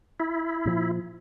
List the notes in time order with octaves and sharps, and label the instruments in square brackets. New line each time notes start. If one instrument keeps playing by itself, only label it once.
[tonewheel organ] E4
[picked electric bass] A#2 F3